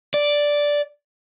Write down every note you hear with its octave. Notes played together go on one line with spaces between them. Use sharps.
D5